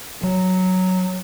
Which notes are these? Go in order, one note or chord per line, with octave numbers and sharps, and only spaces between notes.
F#3